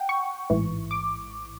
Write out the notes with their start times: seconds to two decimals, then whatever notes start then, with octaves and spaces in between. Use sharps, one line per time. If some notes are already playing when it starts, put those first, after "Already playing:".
Already playing: F#5 G5
0.09 C#6
0.50 A1 G#2 E3
0.91 D6